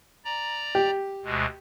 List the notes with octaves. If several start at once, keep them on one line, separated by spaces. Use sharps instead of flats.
D5 A#5
G4
D2 B2 G#3